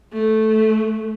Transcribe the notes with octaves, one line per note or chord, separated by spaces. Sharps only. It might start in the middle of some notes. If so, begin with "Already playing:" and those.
A3